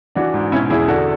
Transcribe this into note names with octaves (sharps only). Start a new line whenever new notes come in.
E3 D4 F#4
G#2
B2 C#4 E4
E2 E4 G#4
D3 F#4 A4